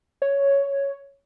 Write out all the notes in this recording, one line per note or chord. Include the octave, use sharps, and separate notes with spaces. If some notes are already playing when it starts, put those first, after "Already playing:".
C#5